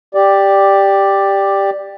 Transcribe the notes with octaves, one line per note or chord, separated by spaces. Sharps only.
G4 D5